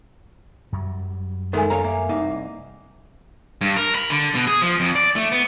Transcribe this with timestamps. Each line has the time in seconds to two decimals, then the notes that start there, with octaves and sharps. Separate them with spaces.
0.72 F#2 F#3 G3
1.53 D#3 G#3 A3 A4 A#4 G#5
1.70 C#5 F5 A#5
1.84 A#3 E5
2.09 C2 A#3 D#4
3.61 G2
3.77 A#4
3.95 B5
4.10 D3
4.35 B2
4.47 G#4
4.62 F3
4.80 F2
4.96 D5
5.16 A3
5.32 B3